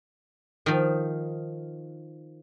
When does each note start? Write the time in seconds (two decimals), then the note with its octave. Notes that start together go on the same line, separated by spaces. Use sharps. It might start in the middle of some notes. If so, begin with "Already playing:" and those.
0.66 D#3 F3